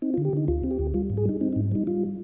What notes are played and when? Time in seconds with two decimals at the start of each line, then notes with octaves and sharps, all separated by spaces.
0.02 C4 D#4
0.14 F4
0.18 D3
0.25 G4
0.33 D3 D#4
0.48 D2 F4
0.63 C4
0.71 G4
0.79 D2
0.94 G3 F4
1.10 G#2
1.17 G#4
1.25 G3 D#4
1.41 C4 D#4
1.53 D#4
1.56 G#2
1.72 G3 D#4
1.87 G3 F4